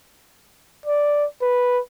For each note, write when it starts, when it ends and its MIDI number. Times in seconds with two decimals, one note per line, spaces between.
0.86 1.26 74
1.42 1.80 71